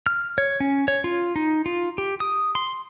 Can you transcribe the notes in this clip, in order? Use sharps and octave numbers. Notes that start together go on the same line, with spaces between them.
F6
C#5
C#4
C#5
F4
D#4
F4
G4
D#6
C6